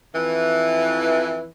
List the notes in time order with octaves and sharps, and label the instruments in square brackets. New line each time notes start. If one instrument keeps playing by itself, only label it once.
[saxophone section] F2 E3